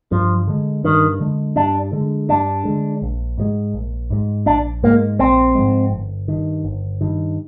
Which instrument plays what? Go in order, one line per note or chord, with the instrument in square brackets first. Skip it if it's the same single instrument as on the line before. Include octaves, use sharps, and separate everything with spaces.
[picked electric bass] G2 [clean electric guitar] F3
[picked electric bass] D3 G#3
[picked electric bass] G2 [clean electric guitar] D#3
[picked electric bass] D3 G#3
[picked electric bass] G2 [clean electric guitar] D4
[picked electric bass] D3 G#3
[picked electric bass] G2 [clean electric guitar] D4
[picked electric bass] D3 G#3
A#1
G#2 F3 G#3
A#1
G#2 F3 G#3
[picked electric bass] A#1 [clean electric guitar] D4
[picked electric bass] G#2 F3 G#3 [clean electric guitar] A#3
[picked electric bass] A#1 [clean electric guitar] C4
[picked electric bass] G#2 F3 G#3
G1
G2 D#3
G1
G2 D#3